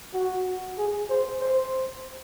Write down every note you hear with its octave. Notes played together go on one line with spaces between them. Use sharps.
F#4
G#4
C5
C5